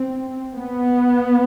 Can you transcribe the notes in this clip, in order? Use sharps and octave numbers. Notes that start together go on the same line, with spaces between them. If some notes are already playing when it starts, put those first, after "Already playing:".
Already playing: C4
B3